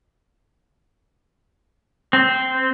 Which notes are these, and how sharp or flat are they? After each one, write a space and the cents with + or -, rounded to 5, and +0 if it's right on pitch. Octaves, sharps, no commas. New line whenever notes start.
C4 -10